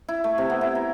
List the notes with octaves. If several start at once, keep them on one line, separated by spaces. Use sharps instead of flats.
E4
A3
C3
B3
E4
A#5